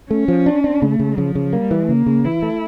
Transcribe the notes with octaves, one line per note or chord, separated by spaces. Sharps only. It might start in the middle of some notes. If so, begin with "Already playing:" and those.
A3 C#4
F3
D4
D4
C#3 A3
C#3
C#3 F3
C#3
G3 A#3
E3
C#3 A#3
C#3
E3 E4
A3